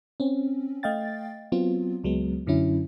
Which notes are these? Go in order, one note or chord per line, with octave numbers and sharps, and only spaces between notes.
C4 C#4
A3 D#5 F5 G5 A6
F#3 B3 C4 F4
C#2 F#3 G#3 B3
F#2 D3 F#3 C#4 E4